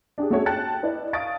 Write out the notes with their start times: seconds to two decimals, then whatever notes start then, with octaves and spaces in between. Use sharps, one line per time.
0.18 D4 G4 G#4
0.30 A3 C#4 F#4 G#4 C#5
0.46 G5 A5 F#6 A6 C#7
0.83 E4 B4 D5 D#5
1.13 F5 A5 C#6 D#6 A6 D7